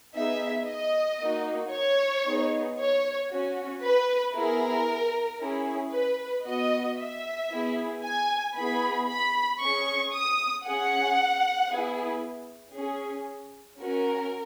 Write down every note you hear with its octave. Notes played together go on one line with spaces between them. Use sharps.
B3 D#4 G#4 E5
D#5
A#3 D#4 F#4
C#5
B3 D#4 G#4
C#5
C#4 F#4
B4
B3 E4 G#4 A#4
C#4 E4 G#4
B4
B3 F#4 D#5
E5
B3 E4 G#4
G#5
B3 E4 G#4 B5
B5
C#4 G#4 C#6
D#6
C#4 G#4 F#5
B3 E4 G#4
C#4 G#4
C#4 F#4 A#4